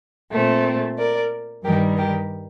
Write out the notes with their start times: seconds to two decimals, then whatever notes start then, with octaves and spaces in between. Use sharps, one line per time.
0.31 A#2 A3 C4
0.97 A#4 D5
1.64 G2 D#3 G3 G4 A#4
1.97 G4 A#4